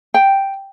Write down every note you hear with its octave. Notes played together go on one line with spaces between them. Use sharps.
G5